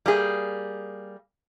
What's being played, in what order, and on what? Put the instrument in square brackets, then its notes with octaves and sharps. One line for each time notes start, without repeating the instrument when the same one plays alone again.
[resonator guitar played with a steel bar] G3 A#3 G#4